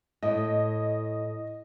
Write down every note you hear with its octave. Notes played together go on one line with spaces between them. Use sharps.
A2 D#5